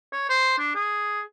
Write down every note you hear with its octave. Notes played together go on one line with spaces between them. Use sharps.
C#5
C5
D4
G#4